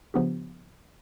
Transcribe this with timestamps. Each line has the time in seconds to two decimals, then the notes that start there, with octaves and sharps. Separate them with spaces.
0.14 C#3 F3 B3 D4 G4